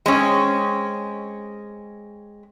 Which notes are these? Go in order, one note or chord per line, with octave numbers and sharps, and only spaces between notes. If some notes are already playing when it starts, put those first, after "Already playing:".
G#3 C4 C#4